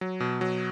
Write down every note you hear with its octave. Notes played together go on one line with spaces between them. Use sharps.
F#3
B2
F#3